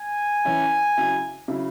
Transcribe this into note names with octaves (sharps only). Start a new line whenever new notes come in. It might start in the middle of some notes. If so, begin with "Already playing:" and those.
Already playing: G#5
E3 C#4 E4
C#3 F#3 E4
C#3 F#3 E4